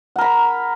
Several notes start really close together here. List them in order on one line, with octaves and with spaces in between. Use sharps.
F#5 A#4 B5 A#5